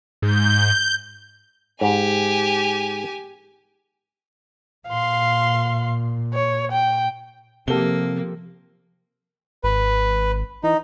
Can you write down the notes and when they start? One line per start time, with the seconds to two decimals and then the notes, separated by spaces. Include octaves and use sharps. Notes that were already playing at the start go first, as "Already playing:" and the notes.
0.22 G#2 G6
1.81 G#2 G4 G#5
4.88 A#2 F5 C6
6.33 C#5
6.72 G5
7.68 C3 F3 A#3 G4 A4 G7
9.64 G#1 B4
10.64 E3 D#4